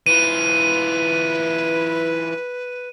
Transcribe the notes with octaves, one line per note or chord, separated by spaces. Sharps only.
E3 F4 B4 D#7